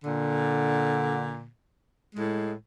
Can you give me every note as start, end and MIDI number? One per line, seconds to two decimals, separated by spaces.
0.05 1.46 46
0.05 1.46 50
2.15 2.53 45
2.15 2.53 56